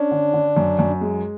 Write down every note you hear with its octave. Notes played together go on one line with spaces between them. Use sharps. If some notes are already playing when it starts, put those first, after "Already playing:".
Already playing: C#4 D4
D3
D3
F#2
F#2
G#3